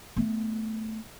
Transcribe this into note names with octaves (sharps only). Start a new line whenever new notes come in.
A3 B3